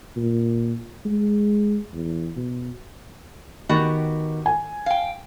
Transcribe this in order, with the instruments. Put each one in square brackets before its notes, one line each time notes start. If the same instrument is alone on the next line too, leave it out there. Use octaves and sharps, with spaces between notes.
[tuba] A#2
G#3
E2
B2
[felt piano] D#3 [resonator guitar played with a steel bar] B3 F#4 G4
[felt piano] G#5
[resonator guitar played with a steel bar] F5 G5